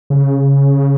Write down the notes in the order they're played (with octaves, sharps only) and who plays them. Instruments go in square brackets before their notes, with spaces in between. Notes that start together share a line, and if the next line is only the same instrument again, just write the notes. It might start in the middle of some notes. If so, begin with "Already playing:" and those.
[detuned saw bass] C#3